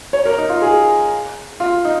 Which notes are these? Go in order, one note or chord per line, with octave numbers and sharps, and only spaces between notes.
C#5
A#4
D#4
F4
G#4
F4
D#4